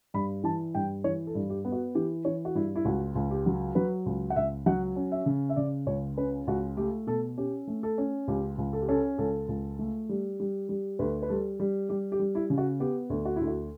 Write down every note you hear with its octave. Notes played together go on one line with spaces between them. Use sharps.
G2 B5
E3 A5
G2 G5
E3 C#5
A4
G2
G4
B3
F#4
E3 G4
E3 C#5
F#4
G2 E4
E4
C#2 F#4
C#2
G4
F#3
F#3 B4
C#2
F#5
C#2 E5
F#3 F#5
C#4
E5
C#3
E5
C#3 D5
C#2 C#5
C#4 B4
C#2 F#4
A3 G4
B2 A4
C#4 G4
A3
A4
C#4
C#2 G4
C#2
A4
G4
C#4 A4
C#2 A4
C#2
A3
G3
G3
G3
D2 B4
B4
G3 A4
G3
G3 G4
G4
G3
E4
C#3
F#4
B3 G4
D2
F#4
D2 E4
F#4